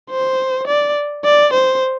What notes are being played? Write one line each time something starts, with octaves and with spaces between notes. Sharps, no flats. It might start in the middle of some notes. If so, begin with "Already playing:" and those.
C5
D5
D5
C5